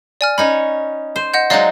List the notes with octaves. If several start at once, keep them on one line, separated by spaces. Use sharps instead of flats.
D5 G#5 F6
C#4 D#4 C#5 B5
C5
D#5 F#5 G6
F#3 G#3 D#4 D5 D#5 F5